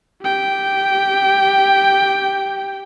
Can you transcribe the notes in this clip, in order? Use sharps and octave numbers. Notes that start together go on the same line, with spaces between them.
G4 G5